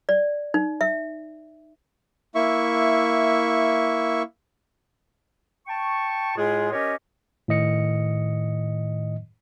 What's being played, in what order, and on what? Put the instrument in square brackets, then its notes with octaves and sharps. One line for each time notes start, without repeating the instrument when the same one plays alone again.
[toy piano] D5
D#4
E5
[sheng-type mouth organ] A#3 E4 E5 C#6
[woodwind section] G5 A5 C#6
A2 G#3 F4 G#4
C#4 G4 A#4 C#5 D#5
[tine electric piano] A2 D#3 D#5 C#7